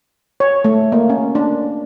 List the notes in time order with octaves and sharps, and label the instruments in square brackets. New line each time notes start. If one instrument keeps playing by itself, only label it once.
[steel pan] C#5
A3
A#3
C#4
D4